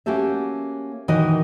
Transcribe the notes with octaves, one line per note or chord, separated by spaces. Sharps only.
A#3 C#4 F#4 G4 A4 E5
A#2 D#3 E3 D#4 F#4 D#5